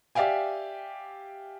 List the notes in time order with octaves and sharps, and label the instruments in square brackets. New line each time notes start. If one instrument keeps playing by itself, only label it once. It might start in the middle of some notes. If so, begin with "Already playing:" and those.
[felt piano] G4 D5 E5 F5 G5 G#5